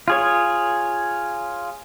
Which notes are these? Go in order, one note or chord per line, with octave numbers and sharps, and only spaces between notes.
F4 G#4 C#5